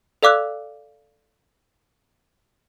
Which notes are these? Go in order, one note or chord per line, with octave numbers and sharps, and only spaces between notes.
A4 D5 F5 D6 E6 F#6